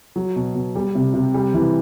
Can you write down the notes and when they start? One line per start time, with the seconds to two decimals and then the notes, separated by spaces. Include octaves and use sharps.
0.16 F#3
0.36 B2
0.55 B2
0.75 G3
0.95 C3
1.14 C3
1.34 G3
1.54 E3